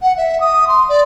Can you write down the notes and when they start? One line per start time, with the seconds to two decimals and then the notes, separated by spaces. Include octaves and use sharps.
0.02 F#5
0.17 E5
0.41 D#6
0.68 C6
0.89 D5